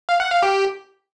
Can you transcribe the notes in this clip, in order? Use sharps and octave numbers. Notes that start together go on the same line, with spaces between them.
F5
F#5
F5
G4